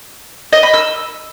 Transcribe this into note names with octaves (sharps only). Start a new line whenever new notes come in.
D#5
B5
E6